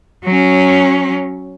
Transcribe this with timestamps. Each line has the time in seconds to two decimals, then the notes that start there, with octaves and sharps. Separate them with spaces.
0.24 F#3 C#4